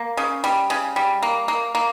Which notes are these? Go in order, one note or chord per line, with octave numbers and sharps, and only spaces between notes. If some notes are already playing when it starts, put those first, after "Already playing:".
Already playing: A#3
C#3
G3
C#3
G3
A#3
A#3
A#3